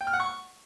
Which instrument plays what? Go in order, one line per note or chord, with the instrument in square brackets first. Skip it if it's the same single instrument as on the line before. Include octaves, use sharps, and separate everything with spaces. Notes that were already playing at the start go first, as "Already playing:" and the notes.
[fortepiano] G5
F6
F#5
C#6